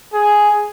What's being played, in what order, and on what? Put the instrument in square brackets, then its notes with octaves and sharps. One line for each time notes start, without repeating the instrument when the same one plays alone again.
[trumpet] G#4